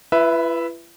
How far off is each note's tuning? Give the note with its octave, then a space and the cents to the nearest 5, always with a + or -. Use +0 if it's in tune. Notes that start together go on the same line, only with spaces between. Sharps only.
E4 +45 B4 +0 E5 +0